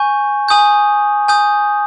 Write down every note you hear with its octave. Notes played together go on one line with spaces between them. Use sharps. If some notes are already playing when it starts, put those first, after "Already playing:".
Already playing: G#5 C#6 G6
G#5 D#6 G6
G#5 D#6 G6